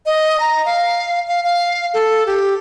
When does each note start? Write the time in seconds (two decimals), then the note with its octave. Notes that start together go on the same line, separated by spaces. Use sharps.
0.06 D#5
0.40 A#5
0.66 F5
1.28 F5
1.44 F5
1.94 A4
2.26 G4